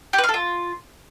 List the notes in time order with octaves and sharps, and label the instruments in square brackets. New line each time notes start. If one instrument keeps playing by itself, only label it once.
[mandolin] G4
B4
F5
A4
F4